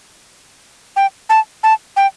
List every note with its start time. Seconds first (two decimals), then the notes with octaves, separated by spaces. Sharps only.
0.96 G5
1.29 A5
1.63 A5
1.96 G5